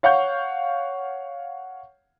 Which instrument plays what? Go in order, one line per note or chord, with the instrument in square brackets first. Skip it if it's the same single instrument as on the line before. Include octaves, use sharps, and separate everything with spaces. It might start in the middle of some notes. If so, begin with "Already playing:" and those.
[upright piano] C#5 F5 F#5 C#6 G6